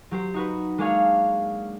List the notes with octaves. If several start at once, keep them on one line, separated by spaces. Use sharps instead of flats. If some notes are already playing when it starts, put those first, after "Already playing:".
F#3 G4 C5
D#4 F#4 B4
G#3 A#3 D4 G#4 C#5 F5